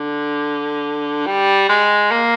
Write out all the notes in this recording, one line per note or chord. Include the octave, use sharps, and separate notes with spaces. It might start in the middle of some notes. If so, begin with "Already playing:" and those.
Already playing: D3
G3
G#3
A#3